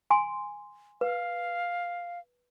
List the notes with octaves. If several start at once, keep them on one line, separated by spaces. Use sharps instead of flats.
G#5 C6
B4 F5